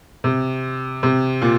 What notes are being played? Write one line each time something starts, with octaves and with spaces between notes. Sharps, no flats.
C3
C3
A#2